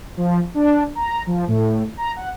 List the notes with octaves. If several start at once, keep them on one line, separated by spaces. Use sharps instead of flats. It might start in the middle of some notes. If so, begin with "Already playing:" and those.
F3
D4
A#5
F3
A2
A#5
F#5